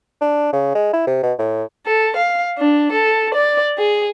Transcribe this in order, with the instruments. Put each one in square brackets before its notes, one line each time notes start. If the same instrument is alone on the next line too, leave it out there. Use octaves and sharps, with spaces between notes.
[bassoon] D4
C#3
G#3
E4
C3
B2
A2
[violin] A4
F5
D4
A4
D5
G#4